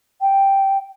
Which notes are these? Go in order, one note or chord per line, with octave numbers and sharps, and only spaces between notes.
G5